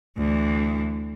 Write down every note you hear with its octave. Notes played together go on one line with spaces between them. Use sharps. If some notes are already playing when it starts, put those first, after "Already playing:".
D2 E3